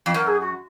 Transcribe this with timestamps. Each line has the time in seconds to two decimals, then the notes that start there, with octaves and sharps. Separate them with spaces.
0.06 F2
0.14 F#2 A#4
0.27 G#4
0.41 F#4